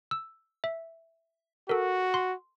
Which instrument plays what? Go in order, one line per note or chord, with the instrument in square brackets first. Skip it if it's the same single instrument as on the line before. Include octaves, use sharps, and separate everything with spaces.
[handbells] E6
E5
[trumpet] F#4 [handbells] A4 A#4
[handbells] C6